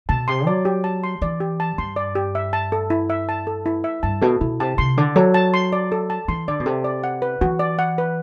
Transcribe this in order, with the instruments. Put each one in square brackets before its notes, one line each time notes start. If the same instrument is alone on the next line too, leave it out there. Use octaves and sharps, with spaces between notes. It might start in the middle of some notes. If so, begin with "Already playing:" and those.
[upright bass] B2 [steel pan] A5
[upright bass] C3 [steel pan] C6
[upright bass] F#3 [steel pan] D5
[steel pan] G4
A5
C6
[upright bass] E3 [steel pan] D5
[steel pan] G4
A5
[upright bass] G2 [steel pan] C6
[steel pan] D5
G4
E5
A5
A4
E4
E5
A5
A4
E4
E5
[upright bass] G2 [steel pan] A5
[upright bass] B2 [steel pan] A4
[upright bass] B2 [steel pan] E4
[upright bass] C3 [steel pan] A5
[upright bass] C3 [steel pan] C6
[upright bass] D3 [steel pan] D5
[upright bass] F#3 [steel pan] A4
[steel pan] A5
C6
D5
A4
A5
[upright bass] E3 [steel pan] C6
[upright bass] D3 [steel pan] D5
[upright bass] B2
[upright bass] C3 [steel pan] A4
[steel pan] D5
F#5
B4
[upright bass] E3 [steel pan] F#4
[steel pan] D5
F#5
B4